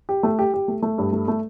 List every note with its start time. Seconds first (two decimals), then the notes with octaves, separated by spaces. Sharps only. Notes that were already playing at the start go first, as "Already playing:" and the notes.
0.09 G4
0.23 A3
0.39 G4
0.54 G4
0.68 A3
0.82 A3
0.98 G2
1.12 A3
1.28 A3